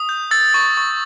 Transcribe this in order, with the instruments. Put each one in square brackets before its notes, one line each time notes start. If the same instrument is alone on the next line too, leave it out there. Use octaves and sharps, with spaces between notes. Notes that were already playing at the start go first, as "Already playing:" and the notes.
Already playing: [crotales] D#6
G6
E6 A6
C#6
C#6